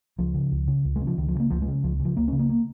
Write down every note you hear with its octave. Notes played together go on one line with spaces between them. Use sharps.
C#2 F3
C#3
C#2
C#3
C#2
G#3
C#3
F3
C#2 D#3
F3
C#3
A#3
C#2 F3
G#3
C#3
C#2 F3
C#3
F3
C#2 A#3
C#4
C#3
A#3
A#3